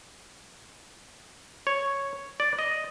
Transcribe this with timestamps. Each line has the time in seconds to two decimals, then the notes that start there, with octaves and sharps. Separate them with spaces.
1.67 C#5
2.40 D5
2.59 D#5